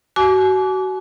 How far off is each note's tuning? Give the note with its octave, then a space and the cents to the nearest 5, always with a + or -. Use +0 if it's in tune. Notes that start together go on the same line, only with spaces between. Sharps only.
F#4 +25 G#5 +45 D6 -25